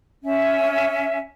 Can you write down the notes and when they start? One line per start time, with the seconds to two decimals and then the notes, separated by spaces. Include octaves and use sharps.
0.23 C#4 E5